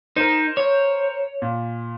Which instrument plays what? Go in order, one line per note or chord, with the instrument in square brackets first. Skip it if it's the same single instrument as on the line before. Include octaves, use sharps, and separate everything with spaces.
[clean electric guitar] D#4 [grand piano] A#4 C5
[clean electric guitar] C#5
[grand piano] A#2